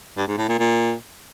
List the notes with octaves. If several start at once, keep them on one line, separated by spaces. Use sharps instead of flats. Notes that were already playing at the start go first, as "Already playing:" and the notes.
G2
G#2
A2
A#2
A#2